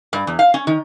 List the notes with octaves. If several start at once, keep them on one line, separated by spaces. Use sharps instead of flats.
G2
E2
F5
C#4
D#3